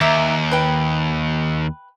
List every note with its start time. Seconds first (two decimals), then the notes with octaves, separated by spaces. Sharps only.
0.01 D#2 E5 A#5 D6
0.51 B4 G5